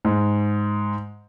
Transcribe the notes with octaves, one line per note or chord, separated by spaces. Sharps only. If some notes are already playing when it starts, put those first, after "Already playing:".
G#2